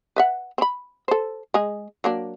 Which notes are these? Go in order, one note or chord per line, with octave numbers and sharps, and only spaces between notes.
B4 E5 F#5
C4 B5
A4 C5
G#3 G#4
F#3 A#3 D4